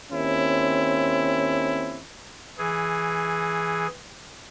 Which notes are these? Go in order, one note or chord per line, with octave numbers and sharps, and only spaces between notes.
D#2 C4 C#4 E4
E3 G#4